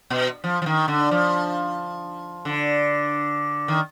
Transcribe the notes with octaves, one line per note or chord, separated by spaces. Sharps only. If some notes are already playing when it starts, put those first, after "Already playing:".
B2
F3
F3
D#3
D3
F3
D3
D#3